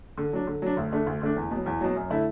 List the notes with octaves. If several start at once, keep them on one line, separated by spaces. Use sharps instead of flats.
D3
F#3 D4
D3
F#3 D4
D2
D3 A3 D4
D2
D3 A3 D4
E2
B2 F#3
E2
B2 F#3
F#2
D3 A3 E4